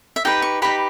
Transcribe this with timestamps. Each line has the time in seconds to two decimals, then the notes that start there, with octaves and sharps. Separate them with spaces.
0.16 E5
0.25 D#4 G4 B4 G5
0.42 C#6
0.62 D#4 G4 B4 B5